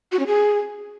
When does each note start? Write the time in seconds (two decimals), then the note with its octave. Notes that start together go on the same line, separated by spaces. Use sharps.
0.12 F#4
0.19 C#4
0.27 G#4